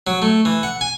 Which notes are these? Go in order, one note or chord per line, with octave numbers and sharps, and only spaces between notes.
F#3
A3
E3
F#5
G#5